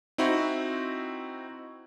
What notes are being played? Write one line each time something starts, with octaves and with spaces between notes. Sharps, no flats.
C4 D#4 E4 F#4